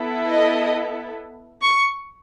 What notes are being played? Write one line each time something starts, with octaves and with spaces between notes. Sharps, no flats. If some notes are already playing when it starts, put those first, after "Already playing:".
Already playing: B3 E4 A4
D#5
C#6